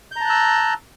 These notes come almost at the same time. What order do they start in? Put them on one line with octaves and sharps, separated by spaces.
G6 A#5 A5 F#6 E6